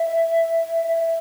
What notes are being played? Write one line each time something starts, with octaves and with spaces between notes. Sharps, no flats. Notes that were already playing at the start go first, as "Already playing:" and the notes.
Already playing: E5
E5